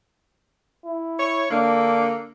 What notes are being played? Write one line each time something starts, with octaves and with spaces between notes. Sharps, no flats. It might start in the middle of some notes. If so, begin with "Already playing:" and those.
E4
C#5
D3 A#3 D4